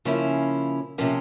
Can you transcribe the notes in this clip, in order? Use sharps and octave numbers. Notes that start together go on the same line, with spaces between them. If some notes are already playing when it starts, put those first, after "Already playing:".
C#3 F3 A#3 C#4 E4
C3 F3 A#3 C#4